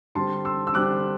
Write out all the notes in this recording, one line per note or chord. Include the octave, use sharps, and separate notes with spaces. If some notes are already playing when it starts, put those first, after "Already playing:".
D3 G3 C4 A5 C6
C6 E6
E6
D3 G3 C4 D6 F#6